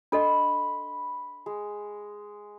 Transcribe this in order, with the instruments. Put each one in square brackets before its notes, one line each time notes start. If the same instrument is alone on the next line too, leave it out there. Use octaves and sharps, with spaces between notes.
[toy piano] D4 A4 D#5 [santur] B5 C6
[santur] G#3